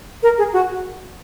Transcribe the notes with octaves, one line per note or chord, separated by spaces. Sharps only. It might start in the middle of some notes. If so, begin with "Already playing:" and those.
A#4
G#4
F#4